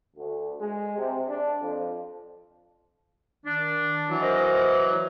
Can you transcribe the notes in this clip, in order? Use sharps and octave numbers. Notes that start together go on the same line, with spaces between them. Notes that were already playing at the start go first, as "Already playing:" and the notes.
D2
G#3
C3
D4
F2
D#3 D4
E3 F#3
A#4 C5 D#5